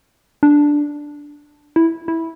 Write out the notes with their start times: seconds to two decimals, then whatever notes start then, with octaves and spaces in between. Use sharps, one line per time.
0.43 D4
1.76 E4
2.08 E4